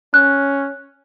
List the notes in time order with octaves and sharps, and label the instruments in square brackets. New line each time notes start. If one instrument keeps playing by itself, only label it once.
[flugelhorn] C#4 [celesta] F#6